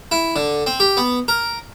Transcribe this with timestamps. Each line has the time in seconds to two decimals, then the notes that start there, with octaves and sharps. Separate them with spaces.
0.12 E4
0.36 D3
0.66 C4
0.80 G4
0.97 B3
1.28 A#4